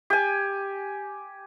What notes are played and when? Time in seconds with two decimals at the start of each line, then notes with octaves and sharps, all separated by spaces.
0.10 G4 G#5